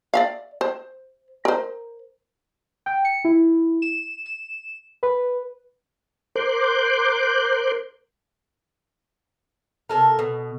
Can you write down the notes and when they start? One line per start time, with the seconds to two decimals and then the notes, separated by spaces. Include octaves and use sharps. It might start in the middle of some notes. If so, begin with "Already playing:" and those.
0.14 D5 E5 F5
0.61 C5
1.45 A#4 C5
2.86 G5
3.05 C#7
3.25 E4
3.82 E7
4.26 E7
5.03 B4
6.36 A#4 C5 C6 D6 F#6 G6
9.89 C3 A4 A#4
10.19 B2